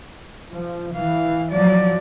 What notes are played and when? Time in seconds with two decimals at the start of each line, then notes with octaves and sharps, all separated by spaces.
0.53 F3
0.96 E3 F5
1.51 F3 F#3 D5